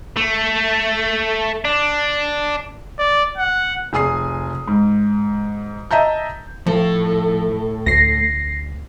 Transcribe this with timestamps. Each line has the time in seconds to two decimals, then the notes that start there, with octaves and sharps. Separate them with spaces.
0.17 A3
1.65 D4
2.99 D5
3.37 F#5
3.93 F1 G#4 G#5 D#6 C7
4.68 G#2
5.91 D#5 E5 A5 A#5 G6
6.66 A2 F3 A4
7.86 D2 A#6 C7